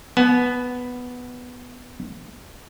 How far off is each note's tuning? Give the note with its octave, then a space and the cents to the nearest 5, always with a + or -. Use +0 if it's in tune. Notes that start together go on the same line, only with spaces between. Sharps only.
B3 +0 A5 -45